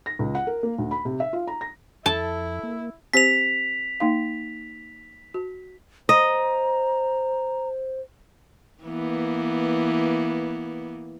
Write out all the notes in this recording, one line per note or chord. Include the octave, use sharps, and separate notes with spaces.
A#6
C#2
F#5
A#4
A#3
D2
B5
C3
E5
F4
A#5
A#6
F2 E4 A4 A5
A#3
C4 G4 C5 B6 F7
A#3 D#4 F5
F#4
C5 D#5 A#5
E3 A#3 B3